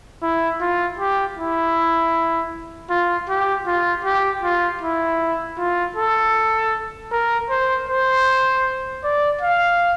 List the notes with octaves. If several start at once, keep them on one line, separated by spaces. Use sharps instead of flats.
E4
F4
G4
E4
F4
G4
F4
G4
F4
E4
F4
A4
A#4
C5
C5
D5
F5